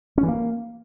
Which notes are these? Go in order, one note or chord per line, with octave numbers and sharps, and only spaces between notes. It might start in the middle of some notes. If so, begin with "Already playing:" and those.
C#4
E3
A#3